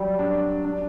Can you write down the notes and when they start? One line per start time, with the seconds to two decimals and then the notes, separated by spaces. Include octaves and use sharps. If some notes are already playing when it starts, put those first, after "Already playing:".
Already playing: F#3 G3
0.19 D4
0.64 D4